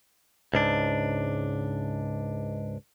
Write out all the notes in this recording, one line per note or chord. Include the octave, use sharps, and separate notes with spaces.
C#2 G#2 D4